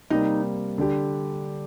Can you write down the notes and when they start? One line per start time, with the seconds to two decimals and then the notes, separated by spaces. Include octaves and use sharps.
0.10 C3 G3 A#3 D#4
0.78 D3 G3 D4 G4